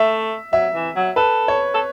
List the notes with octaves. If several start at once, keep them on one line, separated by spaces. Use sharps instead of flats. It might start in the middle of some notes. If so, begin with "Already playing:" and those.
Already playing: A3 E5
F#3 E5
E3
F#3
A4 B4
C#5
A4